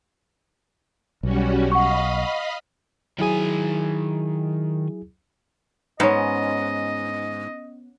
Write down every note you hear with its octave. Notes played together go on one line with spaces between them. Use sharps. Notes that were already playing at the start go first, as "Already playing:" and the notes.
B1 G3 C#4 F#4
D#5 F5 F#5 B5 C#6
D#3 F#3 E4 G#4 G#5
G#2 B3 C#4 D#5